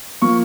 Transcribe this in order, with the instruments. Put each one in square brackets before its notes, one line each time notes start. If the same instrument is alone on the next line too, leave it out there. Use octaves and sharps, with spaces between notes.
[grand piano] F3 A#3 C#6